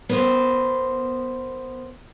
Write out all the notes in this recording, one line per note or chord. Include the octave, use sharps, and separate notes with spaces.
B3 A#4 C5